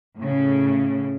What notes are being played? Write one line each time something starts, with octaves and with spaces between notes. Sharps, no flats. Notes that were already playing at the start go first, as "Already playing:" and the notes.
A2 C#3